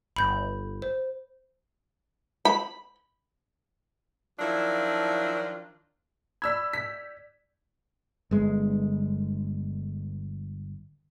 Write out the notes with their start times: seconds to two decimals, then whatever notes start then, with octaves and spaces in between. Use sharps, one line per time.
0.16 G1 B5 G6
0.82 C5
2.45 B5
4.39 D#3 F3 F#3 D4 E4 F4
6.42 D5 B5 E6 G#6 B6
6.73 B6
8.31 G1 G#3